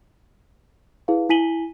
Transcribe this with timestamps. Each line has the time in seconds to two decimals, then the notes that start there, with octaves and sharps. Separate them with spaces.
1.08 E4 G#4 B4 F5
1.29 E4 G#5 B6 D#7 F#7 G7